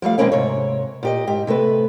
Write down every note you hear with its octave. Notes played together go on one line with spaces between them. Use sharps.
F3 G3 A3 F5
B2 D#3 G#3 A#3 C4 C#4
G#2 C3 C#5
A#2 G4 D#5
G#2 G4
C3 A3 B3 B4